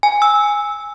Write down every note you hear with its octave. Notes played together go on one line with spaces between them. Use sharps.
G#5
E6